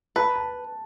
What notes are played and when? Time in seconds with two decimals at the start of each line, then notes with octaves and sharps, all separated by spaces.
0.16 B4 A5
0.36 A5